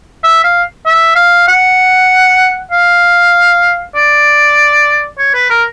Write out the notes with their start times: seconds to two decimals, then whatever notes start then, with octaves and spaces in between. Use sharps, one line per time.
0.24 E5
0.44 F5
0.86 E5
1.16 F5
1.48 F#5
2.71 F5
3.95 D5
5.18 C#5
5.34 B4
5.50 A#4